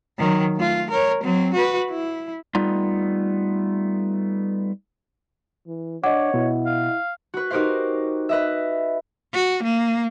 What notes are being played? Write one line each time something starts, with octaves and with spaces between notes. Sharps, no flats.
D#3 F#3
A3 F4
A#4 C#5
F#3 C4
F#4 B4
E4
G3 A3 B3 D#4 F4
E3
D4 C#5 D#5 F#5 D6
B2 E4
F5
F#4 B4
D#4 F#4 G4 A#4 C5 F5
B4 D#5 E5
F#4
A#3